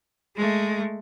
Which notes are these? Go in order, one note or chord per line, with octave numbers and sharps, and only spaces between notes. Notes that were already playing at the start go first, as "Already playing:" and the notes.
G#3 A3